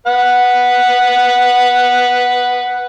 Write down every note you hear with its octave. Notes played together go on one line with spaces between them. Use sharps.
B4 F#5